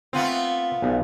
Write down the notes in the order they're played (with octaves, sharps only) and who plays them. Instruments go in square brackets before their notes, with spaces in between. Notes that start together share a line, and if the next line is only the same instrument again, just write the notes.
[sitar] A3 B3 F4 [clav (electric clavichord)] C4
[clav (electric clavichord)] B1